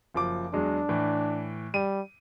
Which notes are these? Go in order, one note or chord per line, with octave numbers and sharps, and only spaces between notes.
F#1 F3 D6
E2 F#3 G#3 D4
A2 E3
G3 D#7